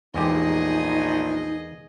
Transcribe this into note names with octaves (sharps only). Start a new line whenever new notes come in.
A#1 E2 G#3 D#4 G4 G#4 D#5